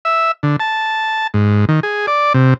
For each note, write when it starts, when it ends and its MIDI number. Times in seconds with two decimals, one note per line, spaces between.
0.05 0.32 76
0.43 0.56 50
0.60 1.27 81
1.34 1.65 44
1.69 1.80 51
1.83 2.06 68
2.07 2.33 74
2.34 2.54 48